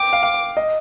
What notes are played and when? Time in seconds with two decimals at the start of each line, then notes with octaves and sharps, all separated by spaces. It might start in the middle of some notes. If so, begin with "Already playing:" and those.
Already playing: G5 D6
0.13 F5
0.23 F5
0.57 D#5